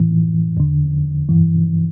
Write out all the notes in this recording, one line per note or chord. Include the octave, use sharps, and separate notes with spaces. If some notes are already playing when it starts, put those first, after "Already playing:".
Already playing: A2 E3
E2 D3
G2 E3